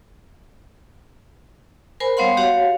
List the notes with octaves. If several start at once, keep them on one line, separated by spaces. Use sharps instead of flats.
A#4 C5 G#5 B5
G3 B3 C#5 F5 F#5 C6
F#4 G4 C#5 F5 F#5